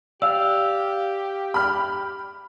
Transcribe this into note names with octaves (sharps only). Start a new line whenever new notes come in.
G4 D5 F5 E6
B5 F6